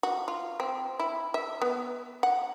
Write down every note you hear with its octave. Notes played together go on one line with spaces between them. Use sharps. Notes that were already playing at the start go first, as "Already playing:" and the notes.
F#4
F4
C4
E4
E5
B3
F#5